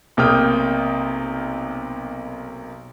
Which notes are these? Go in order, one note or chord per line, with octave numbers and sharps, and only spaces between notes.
B1 C3 A#3 G5 D#6 F6